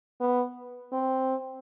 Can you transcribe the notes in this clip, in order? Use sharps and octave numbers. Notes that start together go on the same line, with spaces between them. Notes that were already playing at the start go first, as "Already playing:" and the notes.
B3
C4